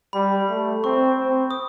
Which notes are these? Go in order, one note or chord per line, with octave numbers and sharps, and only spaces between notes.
G3 B5
A3
C4 C#6
C4
D#6